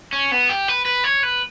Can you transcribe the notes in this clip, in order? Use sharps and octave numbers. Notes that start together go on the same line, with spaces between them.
C#4
B3
G4
B4
B4
C#5
B4